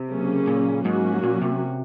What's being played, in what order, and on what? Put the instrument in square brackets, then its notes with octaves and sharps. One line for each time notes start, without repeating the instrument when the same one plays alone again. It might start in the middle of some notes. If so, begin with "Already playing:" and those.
Already playing: [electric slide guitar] C3
[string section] C#3 F#3 A#3 C#4
[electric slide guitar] A#2
[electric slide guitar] G#2 [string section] F#3 A#3 C#4 F#4
[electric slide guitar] A#2
C3